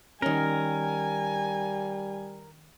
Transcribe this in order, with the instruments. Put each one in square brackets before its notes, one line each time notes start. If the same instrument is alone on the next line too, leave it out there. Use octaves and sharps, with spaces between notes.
[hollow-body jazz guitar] D#3 C#4 [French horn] G3 [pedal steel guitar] A#4 [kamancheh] G#5